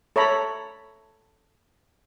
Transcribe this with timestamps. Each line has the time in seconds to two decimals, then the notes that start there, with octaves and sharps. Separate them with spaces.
0.16 A4 C#5 E5 A#5 B5